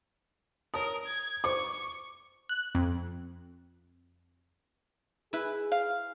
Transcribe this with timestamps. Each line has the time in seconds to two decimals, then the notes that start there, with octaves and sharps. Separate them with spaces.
0.74 A#4 C#5 A5 D#6
1.06 G#6
1.44 C5 C#6 D6
2.49 F#6
2.75 F2
5.33 E4 G#4 B4
5.72 F5